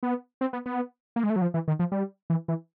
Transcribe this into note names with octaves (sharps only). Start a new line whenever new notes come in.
B3
C4
B3
B3
A#3
G#3
A3
F#3
F3
E3
D#3
F3
G3
E3
E3